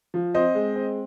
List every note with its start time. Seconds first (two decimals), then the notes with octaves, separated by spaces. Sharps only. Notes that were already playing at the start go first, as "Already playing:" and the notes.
0.14 F3
0.35 C4 C5 D#5
0.55 G#3
0.76 C4